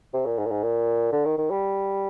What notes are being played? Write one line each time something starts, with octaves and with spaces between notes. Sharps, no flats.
C3
A#2
G#2
A#2
G#2
A#2
D3
D#3
D#3
G3